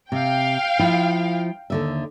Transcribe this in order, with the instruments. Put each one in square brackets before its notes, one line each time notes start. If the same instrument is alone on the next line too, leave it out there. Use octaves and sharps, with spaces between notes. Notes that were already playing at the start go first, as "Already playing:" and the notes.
[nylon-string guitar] C3 [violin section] F5 G5
[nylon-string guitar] F3 E4
D#2 D3 E5